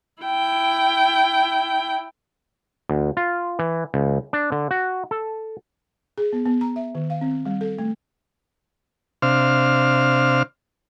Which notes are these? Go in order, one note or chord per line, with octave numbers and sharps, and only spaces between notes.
E4 G5
D2
F4
E3
C#2
D4
D3
F#4
A4
G#4
B3
B3
A#5
E5
D#3
F5
C4
G3
A4
A3
C3 D4 C5 F5 F6